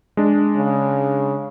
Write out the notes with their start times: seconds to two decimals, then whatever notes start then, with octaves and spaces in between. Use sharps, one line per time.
0.17 G#3 D4
0.56 C#3